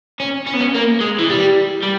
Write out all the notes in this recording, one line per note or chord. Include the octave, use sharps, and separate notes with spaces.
C#4
C#4
B3
C#4
A#3
G#3
E3
G3
G3